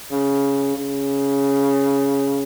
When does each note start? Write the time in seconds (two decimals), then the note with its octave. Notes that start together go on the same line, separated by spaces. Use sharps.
0.11 C#3
0.77 C#3